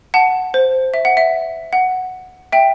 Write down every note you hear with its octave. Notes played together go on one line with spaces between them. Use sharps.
F#5 A5
C5
E5
F#5
E5
F#5
E5 G5